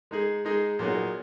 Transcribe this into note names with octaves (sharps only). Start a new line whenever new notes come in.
G#3 D#4 G#4
G#3 D#4 G#4
A#2 F#3 B3 D#4 G#4